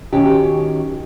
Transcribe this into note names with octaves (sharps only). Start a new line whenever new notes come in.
D#3 C#4 F#4 G4